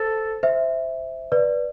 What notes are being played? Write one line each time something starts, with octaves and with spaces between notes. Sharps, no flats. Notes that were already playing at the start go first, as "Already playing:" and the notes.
Already playing: A4 C5
C5 E5
B4 D5